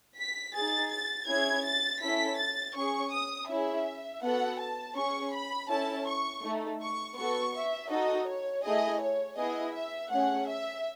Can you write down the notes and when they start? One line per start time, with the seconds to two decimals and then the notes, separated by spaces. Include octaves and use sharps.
0.18 B6
0.54 D#4 G#4 A6
0.91 A6
1.28 C#4 E4 G#4 G#6
1.65 A6
2.01 C#4 E4 A4 B6
2.38 A6
2.75 C#4 G#4 C#6
3.12 D#6
3.49 C#4 E4 G#4 E5
4.22 B3 F#4 A4 F#5
4.59 A5
4.96 C#4 G#4 C#6
5.33 B5
5.69 C#4 E4 A4 A5
6.06 C#6
6.43 A3 D#4 A4
6.80 C#6
7.16 B3 F#4 A4 C#6
7.54 E5
7.90 D#4 F#4 A4 D#5
8.27 C#5
8.63 A3 E4 G#4 D#5
9.01 C#5
9.37 B3 E4 G#4 D#5
9.74 E5
10.10 A3 C#4 G#4 F#5
10.48 E5